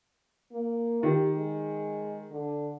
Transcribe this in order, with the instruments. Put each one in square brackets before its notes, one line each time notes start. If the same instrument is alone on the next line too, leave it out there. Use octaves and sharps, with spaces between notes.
[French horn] A#3
[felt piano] D#3 [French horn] G4
[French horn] G#3
D3